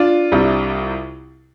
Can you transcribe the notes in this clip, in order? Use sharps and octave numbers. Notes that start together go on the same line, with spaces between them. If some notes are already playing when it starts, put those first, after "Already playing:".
Already playing: D4 F4
C2 C3 G3